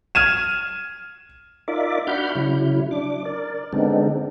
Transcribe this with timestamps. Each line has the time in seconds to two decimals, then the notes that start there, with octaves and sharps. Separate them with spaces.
0.15 F6 G#6 D#7 E7
1.68 D#4 F4 A#4 D5 E5 D6
2.07 D4 F#4 F#5 B5 F6 G6
2.35 C#3 F#3 E4
2.91 D4 D6
3.25 A#4 D5
3.73 D3 G#3 B3 C4 D4 D#4